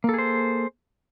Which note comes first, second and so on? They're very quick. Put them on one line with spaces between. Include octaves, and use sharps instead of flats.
A#3 A4 G#4 C5